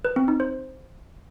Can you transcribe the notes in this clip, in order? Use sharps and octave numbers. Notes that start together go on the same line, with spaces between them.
B4
C4
D#4
C5